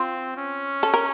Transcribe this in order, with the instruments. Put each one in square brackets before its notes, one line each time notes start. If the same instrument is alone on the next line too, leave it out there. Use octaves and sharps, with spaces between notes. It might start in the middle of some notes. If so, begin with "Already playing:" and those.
Already playing: [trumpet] C4 [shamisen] F4
[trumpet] C#4
[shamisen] A4
A#4